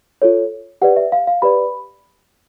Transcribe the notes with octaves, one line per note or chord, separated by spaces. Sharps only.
F4 A4 C#5
G4 B4 D5 F#5
E5
F5
F5
G4 B4 D5 B5